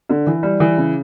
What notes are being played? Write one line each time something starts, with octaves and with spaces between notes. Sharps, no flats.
D3
E3
G3
E3
C#3